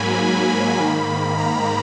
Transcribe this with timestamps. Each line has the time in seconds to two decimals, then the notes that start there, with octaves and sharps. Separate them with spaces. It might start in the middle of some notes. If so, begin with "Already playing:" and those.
Already playing: G#2 F#3 A#3 G#5 B5
0.49 B5
0.78 G#2 D#3 A#3
1.38 A#5